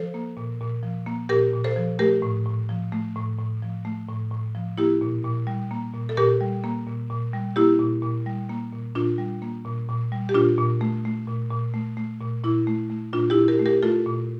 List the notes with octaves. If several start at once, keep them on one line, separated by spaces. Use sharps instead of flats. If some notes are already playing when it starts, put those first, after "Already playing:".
Already playing: F3 A4 C5
A#3
A#2
A#2
F3
A#3
A#2 G4 A#4
A#2
A4 C5
F3
A3 G4 A#4
A2
A2
F3
A3
A2
A2
F3
A3
A2
A2
F3
A#3 E4 G4
A#2
A#2
G3
A#3
A#2
A4
A#2 G4 A#4
G3
A#3
A#2
A#2
G3
A#3 E4 G4
A#2
A#2
G3
A#3
A#2
A#2 D4 F4
G3
A#3
A#2
A#2
G3
G4
A#2 D4 F4
A#2
A3
A3
A#2
A#2
A3
A3
A#2
A#2 E4
A3
A3
A#2 D4 F4
E4 G4
A#2
G4 A#4
A3
G4 A#4
A3 F4 A4
A#2